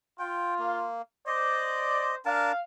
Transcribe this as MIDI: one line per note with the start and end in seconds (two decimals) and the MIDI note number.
0.19 0.86 65
0.19 0.55 79
0.59 1.02 58
1.27 2.13 72
1.27 2.13 74
1.27 2.15 75
2.25 2.52 62
2.25 2.52 70
2.25 2.59 77
2.25 2.52 81